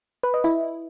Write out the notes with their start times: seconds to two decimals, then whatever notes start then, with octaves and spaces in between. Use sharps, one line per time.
0.23 B4
0.34 D#5
0.44 E4